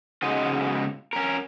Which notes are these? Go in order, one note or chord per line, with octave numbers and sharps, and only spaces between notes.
G#2 C#3 G#3 D#4 F#4 D#5
C#4 A#4